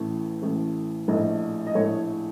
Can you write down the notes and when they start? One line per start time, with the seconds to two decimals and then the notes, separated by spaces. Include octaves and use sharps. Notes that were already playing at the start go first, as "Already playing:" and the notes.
Already playing: A1 A2 A3
0.42 A1 A2 A3
1.08 A#1 A2 A3 D#5
1.67 D#5
1.75 A#1 A2 A3 C#5